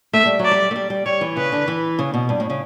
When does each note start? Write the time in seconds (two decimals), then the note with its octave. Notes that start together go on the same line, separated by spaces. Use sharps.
0.13 A3 E5
0.26 G3
0.39 F#3
0.45 D5
0.51 G3
0.71 A3
0.76 G3
0.90 G3
1.06 G3 C#5
1.21 E3
1.37 C#3 B4
1.52 D3
1.68 E3
1.99 C#3
2.14 B2
2.29 G2
2.40 A2
2.50 C#3